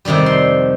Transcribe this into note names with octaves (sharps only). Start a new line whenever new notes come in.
F2 C3 D#3 G3 D5
C6